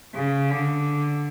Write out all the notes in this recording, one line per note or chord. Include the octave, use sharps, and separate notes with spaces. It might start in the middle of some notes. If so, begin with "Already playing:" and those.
C#3
D3